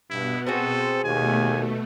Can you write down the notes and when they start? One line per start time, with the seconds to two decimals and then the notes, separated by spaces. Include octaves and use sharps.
0.10 G2 B2 B3 E4
0.47 C4 F#4 G#4 A4 C5
1.04 D#2 B2 A3 G#5